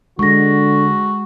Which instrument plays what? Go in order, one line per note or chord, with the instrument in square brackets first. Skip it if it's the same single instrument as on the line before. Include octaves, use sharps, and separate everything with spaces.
[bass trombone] D3 [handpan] G#3 [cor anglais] F#4 [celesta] C#6 A#6